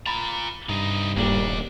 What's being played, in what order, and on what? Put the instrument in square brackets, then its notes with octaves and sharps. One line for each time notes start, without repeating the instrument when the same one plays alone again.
[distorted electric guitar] F4 A#5 [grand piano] B5 A6
[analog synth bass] G2 [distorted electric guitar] C3 D#4
[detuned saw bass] D#1 [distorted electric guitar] D2 D4 [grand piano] G3 A#3